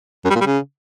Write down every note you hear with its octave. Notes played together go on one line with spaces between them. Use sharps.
F#2
G3
A#2
G3
C#3